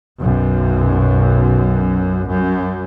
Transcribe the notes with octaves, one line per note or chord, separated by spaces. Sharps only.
B1 F#2
F#2